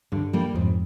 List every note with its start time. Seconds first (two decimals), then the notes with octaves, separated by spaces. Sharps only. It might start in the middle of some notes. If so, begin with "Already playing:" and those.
0.12 G2 D3
0.33 G3 A#3
0.55 F2 G#2